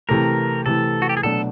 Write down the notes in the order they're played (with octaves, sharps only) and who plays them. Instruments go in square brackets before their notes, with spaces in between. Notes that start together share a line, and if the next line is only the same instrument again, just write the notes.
[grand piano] C3 E3 A3 [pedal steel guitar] A#4
[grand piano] C3 E3 A3 [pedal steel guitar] A4
[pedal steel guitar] F#4
G4
G#4
[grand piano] B2 F#3 A3 D4 [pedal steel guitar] A4